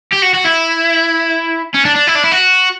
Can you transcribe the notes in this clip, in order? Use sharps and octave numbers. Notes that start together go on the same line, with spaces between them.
G4
F#4
F#4
E4
C#4
D4
D4
E4
D4
E4
F#4